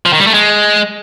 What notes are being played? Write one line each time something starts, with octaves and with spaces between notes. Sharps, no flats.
F3
D#3
G3
A3
G#3